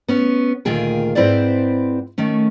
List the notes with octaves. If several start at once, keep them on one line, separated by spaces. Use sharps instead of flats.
B3 C#4
D2 A#2 D#3 F4 G#4 G5
G#2 C4 E4 B4 C5 D5
D#3 A3 C#4